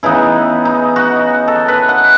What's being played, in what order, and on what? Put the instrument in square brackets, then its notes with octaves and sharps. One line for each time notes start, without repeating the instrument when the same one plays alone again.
[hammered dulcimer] C#3 E3 B3 D#4 E4
D#4
F#4
A4
B4
F#5